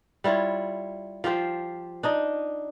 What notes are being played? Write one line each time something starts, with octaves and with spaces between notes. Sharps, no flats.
G3 E4 F4 C#5
F3 F4 G4 C5
D4 D#4 D#5